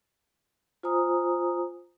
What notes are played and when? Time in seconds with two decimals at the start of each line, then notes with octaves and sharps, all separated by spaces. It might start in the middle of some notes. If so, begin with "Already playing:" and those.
0.83 F4 C5 G#5 A#5 D#6